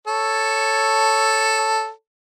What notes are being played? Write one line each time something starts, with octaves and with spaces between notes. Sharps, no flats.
A4 C#5